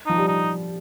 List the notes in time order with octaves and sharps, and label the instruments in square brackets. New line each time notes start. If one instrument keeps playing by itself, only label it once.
[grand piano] F3 [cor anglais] D#4
[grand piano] G3
[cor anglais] D#4